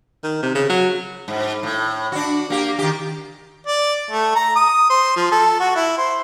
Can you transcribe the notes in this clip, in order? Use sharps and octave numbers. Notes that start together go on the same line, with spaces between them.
D#3
C3
C#3
F#3
G#2
A2
D4 F#4
A#3 G4
D#3 G4
D5
A3
A#5
D#6
C5
F3
A4
F#4
E4
C5